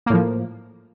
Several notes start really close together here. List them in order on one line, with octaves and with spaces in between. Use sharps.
A#3 A2 F3